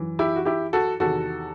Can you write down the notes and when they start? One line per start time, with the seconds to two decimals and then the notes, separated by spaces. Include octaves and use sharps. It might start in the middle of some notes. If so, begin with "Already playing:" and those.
Already playing: F#2 E3
0.19 E4 G4
0.36 F#4
0.45 E4 G4
0.73 F#4 A4
1.00 E2 C3 D#3 F#4 A4